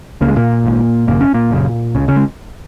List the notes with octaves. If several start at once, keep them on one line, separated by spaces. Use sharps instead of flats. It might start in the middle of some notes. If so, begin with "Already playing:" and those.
C#2 C#3 A#3
G#3
A#2 A#3
G#1 G#2
G#1 F#2 C#3 A#3
C#4
A#2 A#3
F#1 F#2 C#3
C#2 C#3
C#3 C#4
G#3